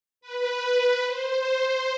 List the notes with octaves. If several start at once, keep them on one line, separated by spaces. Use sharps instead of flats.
B4
C5